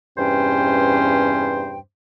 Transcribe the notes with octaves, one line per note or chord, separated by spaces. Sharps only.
E2 G2 C3 C#4 C5 G5